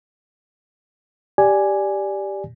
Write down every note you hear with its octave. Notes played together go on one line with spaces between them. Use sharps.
G4 D5 G#5